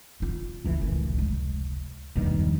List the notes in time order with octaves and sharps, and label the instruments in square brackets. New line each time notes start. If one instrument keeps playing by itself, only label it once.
[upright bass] A#2 F4
[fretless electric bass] F1 C#2 E3
[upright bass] A1 D#3
G#3
[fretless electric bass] E1 G2 D#3 [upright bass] A#1 D#4
[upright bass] F3 G3